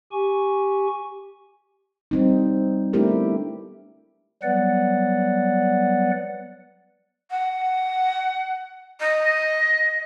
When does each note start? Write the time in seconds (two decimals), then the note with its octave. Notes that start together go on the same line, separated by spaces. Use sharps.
0.12 G4 G#5 C#6
2.11 G3 C4 D#4
2.93 A3 B3 D4 E4 G4 A#4
4.43 F#3 G3 B3 B4 D5 F#5
7.31 F#5
9.00 D#5